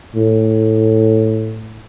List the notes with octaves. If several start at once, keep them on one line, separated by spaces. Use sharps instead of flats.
A2